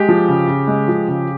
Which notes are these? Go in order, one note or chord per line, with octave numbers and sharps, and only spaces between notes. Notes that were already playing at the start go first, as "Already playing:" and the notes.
Already playing: G#3 G4
F3
C#3
C#3
G#3
F3
C#3